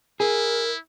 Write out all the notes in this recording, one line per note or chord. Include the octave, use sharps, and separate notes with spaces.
E4 G#4 A#4